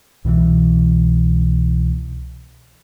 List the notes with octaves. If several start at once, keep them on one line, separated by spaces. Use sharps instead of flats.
C2 B2 D#3 E3